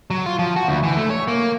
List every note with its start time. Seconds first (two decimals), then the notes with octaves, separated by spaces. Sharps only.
0.11 F#3
0.26 F4
0.39 F3
0.56 F#4
0.68 D2
0.83 E3
0.97 A3
1.10 C#5
1.28 A#3